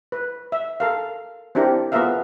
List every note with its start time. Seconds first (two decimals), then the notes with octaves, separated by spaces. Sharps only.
0.12 B4
0.52 E5
0.80 A4 A#4 F5
1.55 C4 D4 E4 G4 A#4
1.92 B3 F4 G#4 A#4 E5 F5